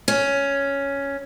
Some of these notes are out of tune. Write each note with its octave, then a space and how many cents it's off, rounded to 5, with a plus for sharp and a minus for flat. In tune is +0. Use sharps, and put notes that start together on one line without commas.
C#4 +5